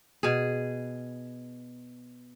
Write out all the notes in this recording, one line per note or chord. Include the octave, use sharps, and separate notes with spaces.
B2 G#4